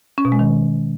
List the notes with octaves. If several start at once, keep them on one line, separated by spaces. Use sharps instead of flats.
C#4
B2
G#3
D#3